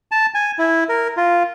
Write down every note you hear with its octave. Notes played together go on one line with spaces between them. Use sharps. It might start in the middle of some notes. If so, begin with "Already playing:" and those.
A5
G#5
E4
A#4
F4